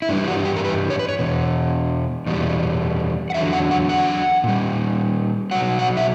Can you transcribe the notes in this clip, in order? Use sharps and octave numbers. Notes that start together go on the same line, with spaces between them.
E4
G2 E3 G3 D4
F#4
G4
A#4
B4
C#5
B4
C#5
E2 B2
E2 B2 G3
F#5
E2 D3 F#3 E5
F#5
F#5
F#5
A#2 G3
B2 F#3 F#5
F#5
E5